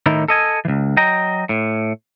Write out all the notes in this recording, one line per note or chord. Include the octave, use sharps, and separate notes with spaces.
A2 D#3 D#4 E4
A4 D#5 G#5
C#2 E3
F#3 D#5 G5 A#5
A2